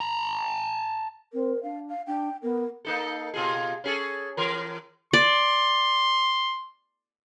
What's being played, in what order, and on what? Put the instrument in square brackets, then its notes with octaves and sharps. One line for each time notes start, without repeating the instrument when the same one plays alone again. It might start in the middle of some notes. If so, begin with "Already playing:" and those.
[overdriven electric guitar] A5 A#5
[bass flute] C4 [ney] A#4
[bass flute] D4 [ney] F5
[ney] F5
[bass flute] D4 [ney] G5
[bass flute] B3 [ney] A#4
[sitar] A#3 D#4 A4
B2 F4 G#4
C#4 G#4 A4
E3 A#4
[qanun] D5 [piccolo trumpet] C6